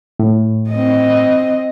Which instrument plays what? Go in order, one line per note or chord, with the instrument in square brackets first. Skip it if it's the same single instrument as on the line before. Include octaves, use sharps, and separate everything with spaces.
[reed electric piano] A2
[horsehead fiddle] C4 D#5